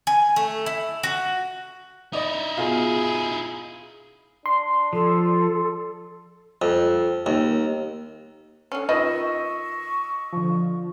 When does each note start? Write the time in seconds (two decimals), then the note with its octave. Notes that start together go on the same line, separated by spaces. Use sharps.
0.07 G#5
0.36 A3
0.66 E4
1.03 F#4
2.13 D#4 E4 D5 D#5
2.57 B2 F4 G#4 F5
4.46 D4 C6
4.93 F3 A4
6.62 F2
7.26 D#2
8.72 D3 C#4
8.89 D#3 F4 B4 D#5 C#6 E6
10.32 D3 F3